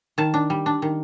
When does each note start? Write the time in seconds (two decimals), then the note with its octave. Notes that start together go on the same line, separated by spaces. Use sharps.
0.18 D#3 A5
0.34 D4
0.50 G3
0.66 D4
0.82 D#3